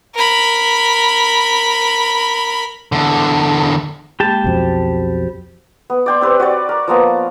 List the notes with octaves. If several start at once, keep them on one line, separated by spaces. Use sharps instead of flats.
A#4 B5
E2 D3
G#3 A#3 G4 A5 B5
B1 F2 F#4 C5 B5
B3
D5 G5 C6
C4 G4 B4
F#4 C#5 D5
A#4
F3 A#3 B3 A#5